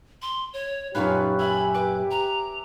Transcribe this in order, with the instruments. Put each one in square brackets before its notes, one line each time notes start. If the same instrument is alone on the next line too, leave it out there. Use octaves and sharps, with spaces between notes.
[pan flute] C6
C#5
[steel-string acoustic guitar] F#2 A#2 [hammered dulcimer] C#4 F4 B4 [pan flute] D#4 [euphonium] G4
[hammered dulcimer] E5 G#5 [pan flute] B5
[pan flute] B4 [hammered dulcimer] D6
[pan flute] A#5